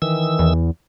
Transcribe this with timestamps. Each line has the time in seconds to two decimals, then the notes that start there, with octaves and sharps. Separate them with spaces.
0.02 D#3 E3 E6
0.39 E2